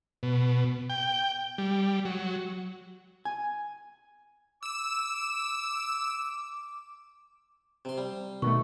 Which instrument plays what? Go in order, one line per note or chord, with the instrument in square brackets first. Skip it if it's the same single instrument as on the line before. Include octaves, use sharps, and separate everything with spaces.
[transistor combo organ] B2
G5
G3
F#3
[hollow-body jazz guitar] G#5
[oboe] D6 [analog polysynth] E6 E7
[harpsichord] C3 C6
G3
[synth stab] B2 [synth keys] D#3 A3 [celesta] C#6